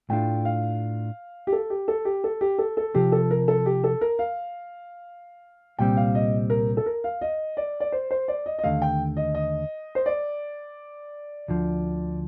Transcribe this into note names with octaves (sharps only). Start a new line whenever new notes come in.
A2 A3 D4 F4 G5
F5
G4
A4
G4
A4
G4
A4
G4
A4
A4
C3 F3 C4 G4
A4
A#4
A4
G4
A4
A#4
F5
C2 A#2 G3 C4 G5
F5
D#5
A#4
A4
A#4
F5
D#5
D5
D5
C5
C5
D5
D#5
D#5
D#2 D3 A3 F5
G5
D#5
D#5
C5
D5
D2 D3 F3